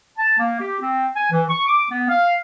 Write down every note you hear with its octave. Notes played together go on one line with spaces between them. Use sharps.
A5
A#3
G4
C4
G#5
E3
C#6
D6
B3
F5